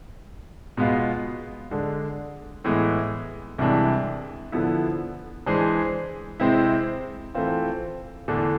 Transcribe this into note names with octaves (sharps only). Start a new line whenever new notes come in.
B2 G#3 B3 F4
D3 G#3 D4
A2 E3 G#3 B3
C2 C3 E3 G#3 D4
D3 F3 B3 E4
E3 G#3 D4 G#4 C5
C3 G#3 C4 E4
E3 A3 C4 F4
E2 D3 A3 D4